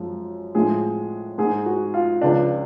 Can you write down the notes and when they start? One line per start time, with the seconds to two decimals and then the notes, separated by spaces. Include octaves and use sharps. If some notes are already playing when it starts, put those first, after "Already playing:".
Already playing: F#2 F3 G#3
0.55 A2 F3 G#3 G#4
1.38 G#2 G#3 G#4
1.66 F#4
1.94 F4
2.21 C#2 C#3 F3 D4